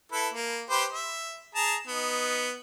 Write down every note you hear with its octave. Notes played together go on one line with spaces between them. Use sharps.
E4 A4 B4
A#3
G4 B4 C5
E5
G#4 A5 A#5
B3 D#4